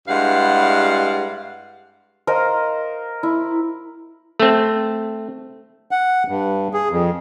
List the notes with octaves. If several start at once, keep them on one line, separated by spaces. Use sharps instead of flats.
G2 G#3 E4 F5 F#5
A#4 C5 D#5 F5
E4
A3 C4
F#5
G2
G#4
F2